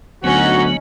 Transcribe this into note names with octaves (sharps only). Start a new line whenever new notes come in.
D2 F#3 B3 C#4 D#4 F#4